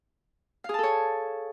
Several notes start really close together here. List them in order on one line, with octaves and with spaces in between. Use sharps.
F5 G#4 A5 A4 C#5